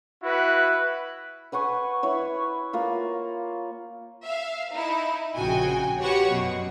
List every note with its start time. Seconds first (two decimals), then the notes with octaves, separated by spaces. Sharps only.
0.23 E4 F#4 B4
1.52 B4 F#5 G#5 C#6
2.03 E4 B4 C#5
2.73 A#3 F4
4.24 E5 F5
4.73 D#4 E4
5.35 A#1 C#3 F#4 G5 G#5
6.00 F#4 G4 B4 C#5 F#5 C#6
6.31 F#2 B2